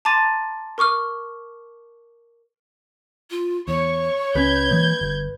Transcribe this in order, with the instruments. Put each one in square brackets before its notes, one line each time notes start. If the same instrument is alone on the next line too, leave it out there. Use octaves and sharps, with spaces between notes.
[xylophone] A5 A#5 C6 D6 A6 D#7
A#4 C#6 D6 F6
[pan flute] F4
[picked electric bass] E2 [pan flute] C#5 [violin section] C#6
[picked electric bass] C#2 C#3 C#4 [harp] B4 [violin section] G6 G#6
[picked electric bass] E3 G#3 A#3
G1